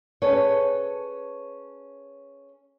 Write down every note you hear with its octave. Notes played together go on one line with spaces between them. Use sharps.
C#4 G#4 A4 B4 C#5